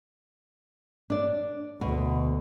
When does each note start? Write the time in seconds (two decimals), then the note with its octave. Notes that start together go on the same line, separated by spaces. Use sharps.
1.10 D4 D5
1.81 D2 B2